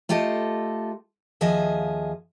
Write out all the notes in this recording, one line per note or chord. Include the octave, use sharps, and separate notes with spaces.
A3 F4 G4 A4 D#5
D#2 F3 G#4 D#5 E5